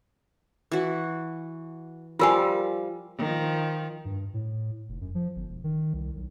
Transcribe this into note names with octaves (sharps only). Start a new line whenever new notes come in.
E3 F#4
F3 G3 F4 A#4 F5 G#5
D#3 F3
G2
A2
F1
F#2
F3
G1
E1
D#3
C2
B1